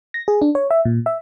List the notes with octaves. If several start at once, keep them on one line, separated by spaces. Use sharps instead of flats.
A#6
G#4
D4
C#5
E5
A#2
E5